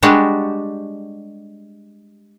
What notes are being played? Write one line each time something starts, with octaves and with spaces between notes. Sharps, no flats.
G3 G#3 D4 F#4 G4